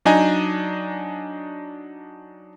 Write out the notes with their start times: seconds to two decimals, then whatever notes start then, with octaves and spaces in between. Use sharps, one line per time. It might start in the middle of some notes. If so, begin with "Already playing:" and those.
0.05 F#3 D4 D#4 D#5 G#5 A#5